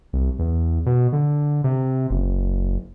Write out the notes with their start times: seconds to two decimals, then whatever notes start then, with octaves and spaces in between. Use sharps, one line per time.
0.13 C2
0.39 E2
0.86 B2
1.13 D3
1.64 C3
2.10 F#1